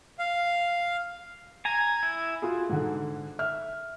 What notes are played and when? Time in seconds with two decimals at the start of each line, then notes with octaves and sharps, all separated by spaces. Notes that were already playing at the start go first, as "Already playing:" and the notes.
0.19 F5
1.65 G#5 A#5 G#6
2.03 E4
2.42 F4 F#4 G#4
2.69 G#2 D3
3.39 E5 F6